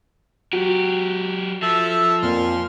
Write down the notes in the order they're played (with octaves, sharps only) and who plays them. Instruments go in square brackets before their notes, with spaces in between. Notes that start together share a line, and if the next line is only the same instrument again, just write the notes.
[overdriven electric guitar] F#3 G4 [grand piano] F#4
[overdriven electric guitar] F3 [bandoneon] A4 E5 A5
[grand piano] F2 A#3 [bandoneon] A#2 C6 F6